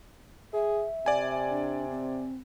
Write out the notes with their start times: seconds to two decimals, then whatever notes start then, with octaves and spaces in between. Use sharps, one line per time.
0.53 G#4 E5
1.06 C3 D5 G#5
1.49 D4
1.90 C4